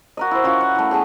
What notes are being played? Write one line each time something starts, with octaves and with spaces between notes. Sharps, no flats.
F#4 A#4 D#5
E4 C5
C#4 F4 F#4
F#5
E3 A3
B3 G#4 G5 A5